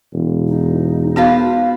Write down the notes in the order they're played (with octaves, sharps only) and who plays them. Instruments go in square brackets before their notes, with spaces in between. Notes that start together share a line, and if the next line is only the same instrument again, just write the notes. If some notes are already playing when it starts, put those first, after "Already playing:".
[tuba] E1
[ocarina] D#4
[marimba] B3 F#4 [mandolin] F4 B4 C5